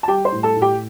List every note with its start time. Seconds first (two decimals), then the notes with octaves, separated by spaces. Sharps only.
0.03 A5
0.08 G3 G4 G5
0.25 C5 C6
0.32 A2
0.43 A4 A5
0.56 A2
0.62 G4 G5